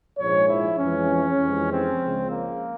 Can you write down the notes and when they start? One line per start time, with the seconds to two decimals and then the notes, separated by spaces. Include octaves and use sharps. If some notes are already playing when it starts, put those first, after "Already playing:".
0.18 A#1 G#2 F3 G#3 C#5
0.49 E4
0.78 F2 E3 G#3 C#4
1.40 F2 C3 E3 G#3
1.70 C4
2.01 C#2 C#3 F3 G#3
2.31 A#3